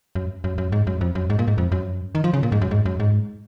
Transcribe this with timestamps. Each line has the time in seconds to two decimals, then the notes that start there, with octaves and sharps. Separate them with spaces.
0.15 F#2
0.44 F#2
0.58 F#2
0.72 G#2
0.87 F#2
1.01 F2
1.15 F#2
1.30 G#2
1.39 A#2
1.48 G#2
1.58 F2
1.72 F#2
2.15 D#3
2.24 F3
2.33 C#3
2.43 A#2
2.52 G#2
2.61 F#2
2.71 G#2
2.85 F#2
3.00 G#2